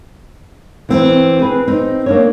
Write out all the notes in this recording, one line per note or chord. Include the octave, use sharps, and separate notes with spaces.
E3 C4
G#4 B4
C4 D#4
A#3 D4 C#5